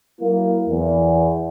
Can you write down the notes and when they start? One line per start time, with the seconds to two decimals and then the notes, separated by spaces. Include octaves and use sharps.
0.21 F#3 A#3 E4 A#4
0.69 E2